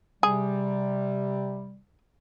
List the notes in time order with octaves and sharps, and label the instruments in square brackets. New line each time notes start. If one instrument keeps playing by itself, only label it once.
[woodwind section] C3 G3 [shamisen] G#4